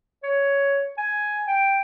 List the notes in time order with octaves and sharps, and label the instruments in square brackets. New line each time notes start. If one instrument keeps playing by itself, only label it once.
[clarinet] C#5
G#5
G5